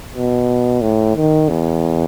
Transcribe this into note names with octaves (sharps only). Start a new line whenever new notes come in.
B2
A2
D#3
E2